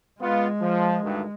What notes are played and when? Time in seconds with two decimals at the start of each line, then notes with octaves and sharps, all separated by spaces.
0.20 G#3 B3 F4
0.62 F3
1.03 D2 G2 D#3